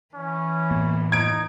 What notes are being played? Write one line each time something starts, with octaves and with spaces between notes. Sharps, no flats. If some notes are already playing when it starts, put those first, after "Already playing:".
E3 C#4
A2 A#3 B3
D#4 G#6 D7